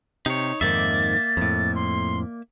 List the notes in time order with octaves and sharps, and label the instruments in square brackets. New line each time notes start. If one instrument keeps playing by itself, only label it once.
[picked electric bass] C3 [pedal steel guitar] D#4 C#5
[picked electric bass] F2 G#2 D#3 [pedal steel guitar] A#3 D5 E5 [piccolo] A6
[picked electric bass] F2 A2
[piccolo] C6